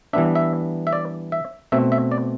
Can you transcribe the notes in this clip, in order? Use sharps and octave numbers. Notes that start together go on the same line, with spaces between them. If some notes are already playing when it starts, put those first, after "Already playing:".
E3 G3 B3 D4 E5
E5
E5
D5
E5
B2 A3 C4 E5
E5
D5